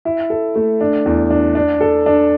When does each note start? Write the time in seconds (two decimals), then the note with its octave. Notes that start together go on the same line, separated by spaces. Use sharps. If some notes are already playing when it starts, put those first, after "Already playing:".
0.05 E4
0.30 A4
0.55 A3
0.81 D4
1.06 E2
1.31 D4
1.55 D4
1.81 A4
2.06 D4